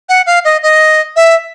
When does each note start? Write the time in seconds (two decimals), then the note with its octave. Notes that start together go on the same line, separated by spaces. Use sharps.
0.09 F#5
0.27 F5
0.45 D#5
0.63 D#5
1.16 E5